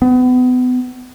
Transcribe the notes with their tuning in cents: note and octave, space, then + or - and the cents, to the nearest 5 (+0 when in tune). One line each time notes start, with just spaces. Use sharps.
B3 +30